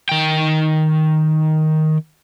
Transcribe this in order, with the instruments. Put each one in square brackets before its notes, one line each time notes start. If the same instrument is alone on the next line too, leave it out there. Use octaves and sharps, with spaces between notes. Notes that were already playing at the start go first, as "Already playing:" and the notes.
[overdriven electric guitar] D#3 G5